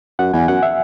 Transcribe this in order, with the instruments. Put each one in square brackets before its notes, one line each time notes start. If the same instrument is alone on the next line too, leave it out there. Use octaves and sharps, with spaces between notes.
[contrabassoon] F#2 [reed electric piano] F#5
[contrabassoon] E2 [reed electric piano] G#5
[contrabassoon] F#2 [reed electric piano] F#5
[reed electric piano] E5